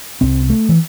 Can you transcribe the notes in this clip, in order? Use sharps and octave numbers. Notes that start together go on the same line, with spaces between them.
C2 C3 C4
A3
E3